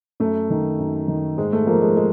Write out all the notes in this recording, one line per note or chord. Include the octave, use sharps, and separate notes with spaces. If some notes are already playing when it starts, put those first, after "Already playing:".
F#2 A3
D#3
F#2
D#3
G#2 G#3
A3
F3 A#3
G#3
G#3